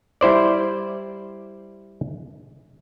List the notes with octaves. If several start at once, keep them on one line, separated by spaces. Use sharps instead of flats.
G3 E4 C5 D5